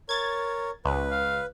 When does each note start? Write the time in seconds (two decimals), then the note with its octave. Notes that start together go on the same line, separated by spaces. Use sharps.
0.09 A#4 C#5 G#6 A6
0.85 C#2 B4
1.11 F5